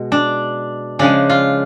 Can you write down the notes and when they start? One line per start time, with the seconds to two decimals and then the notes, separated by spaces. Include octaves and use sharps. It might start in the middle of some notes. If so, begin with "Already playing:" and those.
Already playing: B2 G#3
0.12 D4
0.99 C#3 F3 G#3 D4
1.30 F4